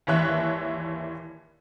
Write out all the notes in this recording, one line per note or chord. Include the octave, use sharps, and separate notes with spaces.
G#1 D#2 E3 C#5 E5 F#6